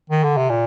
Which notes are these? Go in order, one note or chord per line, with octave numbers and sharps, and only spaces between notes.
D#3
D3
C3
A#2